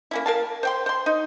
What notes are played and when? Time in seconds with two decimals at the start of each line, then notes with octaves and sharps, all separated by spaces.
0.11 A#3 C#4 E4
0.26 A#4 F5 A5
0.63 C5 G5 C6
0.86 C5 C6
1.06 D#4